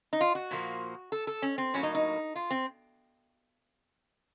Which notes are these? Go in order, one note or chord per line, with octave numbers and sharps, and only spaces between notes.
D#4
F4
F#4
A#2 F3 A#3
A4
A4
C#4
C4
A2 F#3 A#3 C#4
D#4
D#4
F4
C4